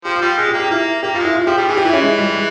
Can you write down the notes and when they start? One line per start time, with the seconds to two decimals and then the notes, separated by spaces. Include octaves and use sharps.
0.05 F3 G4
0.16 F4
0.22 G3
0.38 G#3 G#4
0.43 F4
0.48 G4
0.54 A#3
0.60 G4
0.70 A#3 E4
1.03 A#3 G4
1.15 G3 F4
1.19 G#3
1.25 E4
1.36 F4
1.47 F3 G4
1.58 G3 G4
1.69 E3 G#4
1.77 G4
1.85 E3 E4
1.93 C#4
2.02 G#3
2.18 G3
2.33 G#3